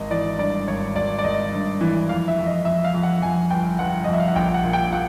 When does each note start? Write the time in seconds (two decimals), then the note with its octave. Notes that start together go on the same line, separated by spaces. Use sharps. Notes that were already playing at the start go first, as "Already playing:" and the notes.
Already playing: G#1 D#5
0.10 E3 D5
0.39 G2 D5
0.67 G#1 C#5
0.96 G#1 D5
1.18 D5
1.24 G#1 D#5
1.52 G2
1.81 E3
2.09 F2 F5
2.28 E5
2.38 F2
2.46 D#5
2.65 F2 E5
2.84 F5
2.94 F2
3.03 F#5
3.22 F2 G#5
3.51 G1 G5
3.79 G1 F#5
4.04 D#5
4.07 F2
4.13 E5
4.20 F5
4.28 F#5
4.35 A#1 G5
4.54 F#5
4.64 A#2
4.73 G5
4.92 A#2 F#5